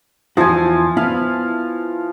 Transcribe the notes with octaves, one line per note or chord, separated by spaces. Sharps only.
E2 F3 E4 F#4 G#5
B3 E4 F5